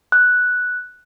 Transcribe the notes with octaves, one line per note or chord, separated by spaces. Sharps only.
F#6